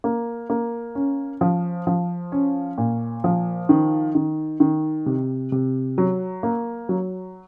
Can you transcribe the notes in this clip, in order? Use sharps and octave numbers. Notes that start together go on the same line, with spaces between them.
A#3
A#3
C#4
F3
F3
C#4
A#2
F3
D#3
D#3
D#3
C3
C3
F#3
A#3
F#3